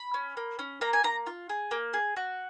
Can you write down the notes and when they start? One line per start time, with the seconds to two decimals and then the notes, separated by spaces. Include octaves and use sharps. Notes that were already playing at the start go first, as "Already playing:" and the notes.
Already playing: B5
0.14 C#4
0.37 A#3
0.59 C#4
0.81 A#3 A#5
0.93 G#5
1.04 A#3 A#5
1.27 F4
1.49 G#4
1.71 A#3
1.94 G#4
2.16 F#4